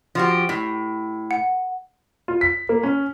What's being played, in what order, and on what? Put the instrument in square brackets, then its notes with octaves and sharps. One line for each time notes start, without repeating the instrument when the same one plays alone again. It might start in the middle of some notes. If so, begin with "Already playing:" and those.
[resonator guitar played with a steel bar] F3 F#4 G4
A2
[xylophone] F#5
[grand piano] F4
B6
A#3
C#4